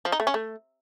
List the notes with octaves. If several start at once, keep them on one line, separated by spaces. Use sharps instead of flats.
F3
D#4
A3
C#4
A3